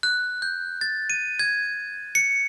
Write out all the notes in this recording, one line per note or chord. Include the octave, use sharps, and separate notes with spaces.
F#6
G6
A6
D#7
G#6
C#7